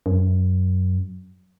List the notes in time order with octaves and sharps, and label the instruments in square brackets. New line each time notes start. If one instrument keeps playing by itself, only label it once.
[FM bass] F#2